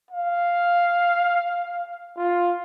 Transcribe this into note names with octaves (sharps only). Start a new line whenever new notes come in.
F5
F4